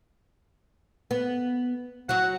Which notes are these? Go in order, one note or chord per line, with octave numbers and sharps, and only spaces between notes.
B3
F#3 F#4 F#5